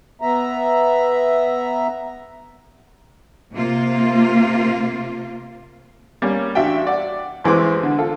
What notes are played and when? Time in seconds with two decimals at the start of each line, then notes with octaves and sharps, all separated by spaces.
0.21 B3 E5 A#5
3.53 C3 A#3 F4
6.22 G3 A#3 C#4
6.55 A1 D4 F#4 E5 F5 G5
6.87 D5 F#5
7.44 A1 E3 G#3 C4 D6
7.83 D3
7.99 F4 A4